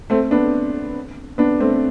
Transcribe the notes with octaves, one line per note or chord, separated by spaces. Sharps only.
A3 C4
B3 D4
B3 D4
A3 C4